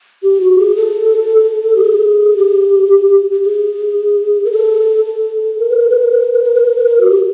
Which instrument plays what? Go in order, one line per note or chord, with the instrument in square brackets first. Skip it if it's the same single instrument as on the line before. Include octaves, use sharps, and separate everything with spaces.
[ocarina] G4
F#4
G#4
A4
G4
G#4
G4
G#4
A#4
A4
A4
A#4
B4
A#4
B4
A#4
B4
A#4
B4
A#4
B4
A#4
B4
A#4
F#4
G4